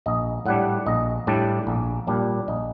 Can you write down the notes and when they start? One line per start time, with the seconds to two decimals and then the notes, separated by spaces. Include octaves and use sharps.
0.06 A#1 D#5
0.46 A2 G3 D4 F#5
0.86 A#1 D#5
1.27 A2 G3 D4 D5
1.67 A#1
2.07 A#2 G3 D4
2.48 A#1 D#5